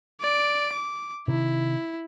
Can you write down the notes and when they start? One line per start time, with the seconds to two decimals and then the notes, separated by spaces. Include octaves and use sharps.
0.21 D5 D7
0.73 D6
1.28 C3 D#3 E4